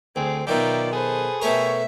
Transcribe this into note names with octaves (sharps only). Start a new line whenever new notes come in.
D2 C4 G#4
B2 D#3 F#3 D#4 F4 D5 E5 G5
G#4 A4 B4 C5
B2 A3 A#4 C#5 E5 G5